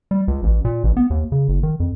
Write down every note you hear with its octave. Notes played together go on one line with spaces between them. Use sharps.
G3
C#2
A1
A#2
A1
B3
D#2
C#3
F#1
D#3
F2